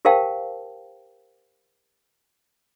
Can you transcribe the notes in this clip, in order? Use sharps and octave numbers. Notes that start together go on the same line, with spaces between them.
G4 A#4 C5 F5 G5 A5